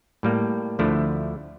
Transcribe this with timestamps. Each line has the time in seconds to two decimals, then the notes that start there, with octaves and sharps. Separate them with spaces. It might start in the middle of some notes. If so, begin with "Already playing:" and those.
0.23 A2 G3 A#3
0.79 D2 D3 F3 A3 E4